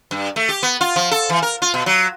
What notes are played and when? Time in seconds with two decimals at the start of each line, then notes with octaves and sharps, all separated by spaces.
0.11 G2
0.36 A3
0.49 G4
0.63 B3
0.81 F4
0.96 F3
1.11 A4
1.29 E3
1.42 A#4
1.62 F4
1.74 B2
1.86 F#3